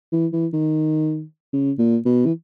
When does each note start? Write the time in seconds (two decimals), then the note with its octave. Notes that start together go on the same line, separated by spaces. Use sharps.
0.13 E3
0.33 E3
0.53 D#3
1.53 C#3
1.79 A#2
2.05 B2
2.26 E3